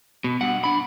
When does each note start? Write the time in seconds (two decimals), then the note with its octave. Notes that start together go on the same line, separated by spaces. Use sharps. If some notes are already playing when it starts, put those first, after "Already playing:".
0.24 B2
0.41 G2 F#5
0.64 D4 B5